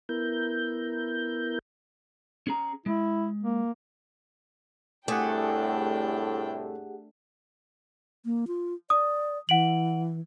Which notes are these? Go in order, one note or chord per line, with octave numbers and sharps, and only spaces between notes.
B3 E4 A#4 G6
C#4 G#4 A#5
G#3 E4
A#3
C2 A2 A3 D4 G4 G#4 F#5 G5
A#3
F4
D5 D#6
E3 F#5 D7 F#7